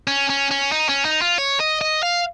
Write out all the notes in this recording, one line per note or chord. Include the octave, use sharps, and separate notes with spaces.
C#4
C#4
C#4
D#4
C#4
D#4
F4
C#5
D#5
D#5
F5